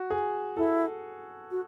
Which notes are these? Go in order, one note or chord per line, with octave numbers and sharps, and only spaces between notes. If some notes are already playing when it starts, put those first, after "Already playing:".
Already playing: F#4
G#4
E4 A4
F#4